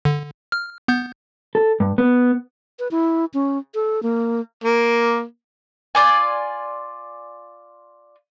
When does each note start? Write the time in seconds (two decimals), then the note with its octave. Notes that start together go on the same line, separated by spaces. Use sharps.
0.05 D3
0.52 F6
0.88 B3 G6
1.55 A4
1.80 G2
1.98 B3
2.79 B4
2.91 E4
3.34 C#4
3.74 A4
4.03 A#3
4.64 A#3
5.95 F4 D5 G#5